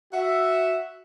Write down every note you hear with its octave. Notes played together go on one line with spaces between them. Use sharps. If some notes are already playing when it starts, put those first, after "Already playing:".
F#4 E5